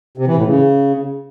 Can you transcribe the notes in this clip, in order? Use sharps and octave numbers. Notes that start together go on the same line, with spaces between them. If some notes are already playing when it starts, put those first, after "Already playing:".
C3
E3
A2
C#3